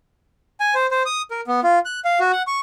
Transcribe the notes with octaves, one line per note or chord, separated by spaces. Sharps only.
G#5
C5
C5
D#6
A#4
B3
F4
F#6
F5
F#4
F#5
C#6